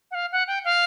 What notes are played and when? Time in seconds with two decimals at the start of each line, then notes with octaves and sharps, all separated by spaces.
0.11 F#5
0.15 F5
0.32 F#5
0.47 G5
0.65 F5